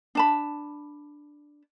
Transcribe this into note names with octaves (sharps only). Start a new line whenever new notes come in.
D4 A5 B5